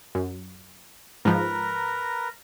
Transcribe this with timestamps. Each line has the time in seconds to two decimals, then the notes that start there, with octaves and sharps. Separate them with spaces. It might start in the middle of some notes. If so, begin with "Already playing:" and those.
0.15 F#2
1.25 G#2 F3 A#4 B4 A#5